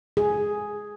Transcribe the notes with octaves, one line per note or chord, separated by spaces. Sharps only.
G#4